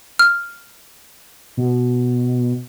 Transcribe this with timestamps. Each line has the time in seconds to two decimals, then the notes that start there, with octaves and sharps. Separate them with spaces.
0.19 F6
1.57 B2